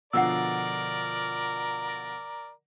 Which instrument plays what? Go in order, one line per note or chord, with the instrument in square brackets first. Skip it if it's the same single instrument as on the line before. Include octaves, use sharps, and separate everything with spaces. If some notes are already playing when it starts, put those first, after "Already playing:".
[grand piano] B2 D3 F3 [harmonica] A#4 D5 [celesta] F#5 E6